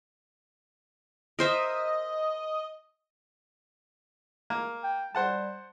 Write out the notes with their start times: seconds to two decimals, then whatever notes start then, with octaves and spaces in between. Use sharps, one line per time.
1.39 A#4 C5 D#5 E5
4.50 A#3
4.84 G5
5.15 G3 C5 F#5 A5